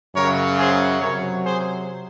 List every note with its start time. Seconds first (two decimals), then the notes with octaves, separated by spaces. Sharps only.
0.15 F#2 C#3 F#3 A#4 C#5
0.58 G#4 C5
1.01 C3 F#3 A#4 C#5
1.44 G#4 C5